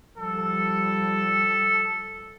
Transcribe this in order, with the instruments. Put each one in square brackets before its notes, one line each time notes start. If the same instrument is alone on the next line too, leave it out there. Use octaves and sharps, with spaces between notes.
[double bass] F3 G3 [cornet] A4